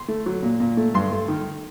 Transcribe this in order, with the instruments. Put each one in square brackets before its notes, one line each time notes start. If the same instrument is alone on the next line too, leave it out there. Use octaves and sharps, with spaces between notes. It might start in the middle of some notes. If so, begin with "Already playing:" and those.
Already playing: [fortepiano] C6
A3
F#3
A#2
A#2
A3
G2 C6
A3
D#3